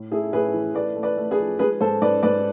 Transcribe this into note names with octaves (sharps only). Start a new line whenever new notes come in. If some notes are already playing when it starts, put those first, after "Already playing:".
Already playing: A2
A3 E4 G#4
A2 G#4 B4
E3
A3 B4 D5
A3
B4 D5
A3
G#4 B4
F3
G#3 G#4 B4
G#2 A4 C5
G#2 B4 D5
G#2 B4 D5